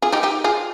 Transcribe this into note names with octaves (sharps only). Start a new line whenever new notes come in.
F4 G#4
D#4 G4
D#4 G4
F4 G#4